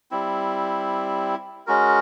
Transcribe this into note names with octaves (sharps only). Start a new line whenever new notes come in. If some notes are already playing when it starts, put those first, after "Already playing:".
G3 C4 E4
G#3 C#4 F#4 A#4